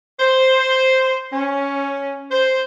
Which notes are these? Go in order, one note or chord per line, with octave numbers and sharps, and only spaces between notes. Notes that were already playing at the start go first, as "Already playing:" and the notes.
C5
C#4
C5